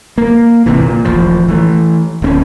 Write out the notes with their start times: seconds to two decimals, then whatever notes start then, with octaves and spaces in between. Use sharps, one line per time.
0.18 A#3
0.66 G#1 C3 E3
0.81 A#2
1.05 D#1 A1 F3
1.49 E3 A3
2.22 D1 C4 C#4